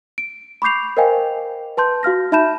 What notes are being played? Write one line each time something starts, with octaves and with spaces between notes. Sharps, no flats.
D7
B5 C#6 D6 G6 C7 F7
A#4 C5 D#5 F5 G5 G#5
B4 A5 C6 G6
F#4 F5 F6 A#6
D#4 E5 A5 B5 G6 E7